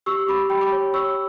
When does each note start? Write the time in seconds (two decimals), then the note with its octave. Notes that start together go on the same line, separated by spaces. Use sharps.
0.06 G4 C#6 E6
0.28 G4 B5 D6
0.50 G4 G5 B5
0.61 B5 D6
0.72 C#5
0.94 C#5 C#6 E6